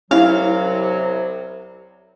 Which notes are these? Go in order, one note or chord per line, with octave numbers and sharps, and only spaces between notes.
C2 C3 F#3 C#4 E4 F5